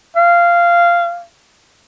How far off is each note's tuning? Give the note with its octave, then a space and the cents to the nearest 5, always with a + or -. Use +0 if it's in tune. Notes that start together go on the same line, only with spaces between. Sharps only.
F5 -15